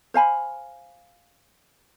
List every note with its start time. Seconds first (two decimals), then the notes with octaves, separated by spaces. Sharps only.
0.14 C5 F5 G#5 B5